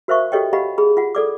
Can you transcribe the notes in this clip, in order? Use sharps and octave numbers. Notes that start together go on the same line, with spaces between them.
F#4 A#4 C5 E5 F5 C#6
F#4 G4 A4 C#5 D#5 G5
G4 D#5 F5 F#5 B5
G#4 B5
F4 F#5
A4 D5 D6